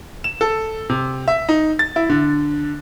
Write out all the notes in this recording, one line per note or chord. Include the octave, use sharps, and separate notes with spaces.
E7
A4
C3
E5
D#4
A6
E4
D3